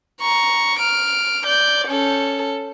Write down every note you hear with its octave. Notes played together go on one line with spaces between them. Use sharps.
A#5 C#6
F6 D7
D5 G6
C#4 A4